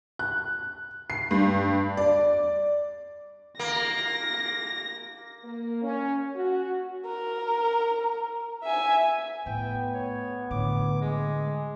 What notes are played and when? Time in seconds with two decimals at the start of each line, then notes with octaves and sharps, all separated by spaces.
0.19 F#6
1.10 C7
1.31 G2
1.97 D5
3.60 A#3 A#6
5.44 A#3
5.83 C#4
6.35 F#4
7.06 A#4
8.63 E5 G#5
9.46 A2 B3 G5
9.94 C#5
10.51 A2 D3 D6
11.01 G#3 G#4